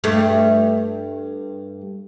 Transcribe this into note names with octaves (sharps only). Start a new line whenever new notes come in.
G2 A3